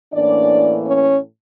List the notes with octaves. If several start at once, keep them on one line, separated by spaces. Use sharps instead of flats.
A2 E3 A#3 C#4 D4 D5
C#4 C#5